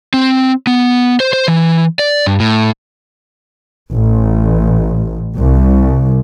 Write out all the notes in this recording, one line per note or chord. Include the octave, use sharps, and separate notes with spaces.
C4
B3
C5
C5
E3
D5
G2
A2
A1
C2